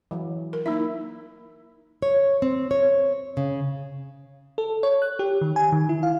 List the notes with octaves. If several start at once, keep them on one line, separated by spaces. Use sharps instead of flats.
E3 F#3
A#4
A#3 D#4 E4 E5
C#5
C4
C#5
C#3
A4
C#5
F#6
G4
D#3
G#5
D#3
E4
F5